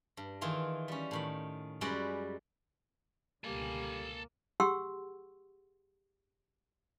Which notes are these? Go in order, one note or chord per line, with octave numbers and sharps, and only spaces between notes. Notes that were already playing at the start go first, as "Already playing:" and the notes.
G2
D#3 E3 F4 G#4
G3 C#4
A2 D#3 B5
F#2 G3 G#3 F#4 B4 D5
C#2 B2 D3 G3 A#3 A4 G#5
G4 G#4 F#5 C6 C#6 E6